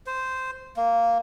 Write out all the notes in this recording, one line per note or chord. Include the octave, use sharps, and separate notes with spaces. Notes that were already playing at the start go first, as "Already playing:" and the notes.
C5
A#3